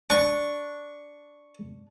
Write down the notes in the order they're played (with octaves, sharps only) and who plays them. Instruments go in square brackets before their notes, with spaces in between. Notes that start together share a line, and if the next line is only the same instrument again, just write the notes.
[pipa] D4 [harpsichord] C#6